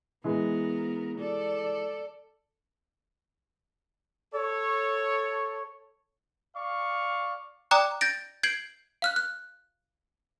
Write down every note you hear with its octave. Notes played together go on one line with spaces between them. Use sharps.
E3 G#3 B3 A#4
A4 D5
A4 C#5
D5 F5 C#6
D5 G5 A#5 D6 D#6 F#6
G6 A6 A#6 D7
G6 G#6 C7 D7 F#7
F5 F6 F#6
F#6